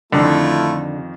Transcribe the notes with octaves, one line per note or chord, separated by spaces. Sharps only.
F2 D3 D#3 A3 E4 F4